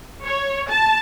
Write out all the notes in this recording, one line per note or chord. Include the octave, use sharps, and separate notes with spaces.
C#5
A5